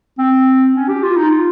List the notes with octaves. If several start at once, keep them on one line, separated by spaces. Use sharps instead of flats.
C4
C#4
G4
F4
D#4
F4